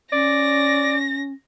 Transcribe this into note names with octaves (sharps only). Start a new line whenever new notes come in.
C#4 D5 A#6